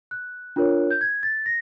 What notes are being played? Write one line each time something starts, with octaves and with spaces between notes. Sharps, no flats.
F#6
D4 F4 A#4 C#5
G6
G#6
A6
A#6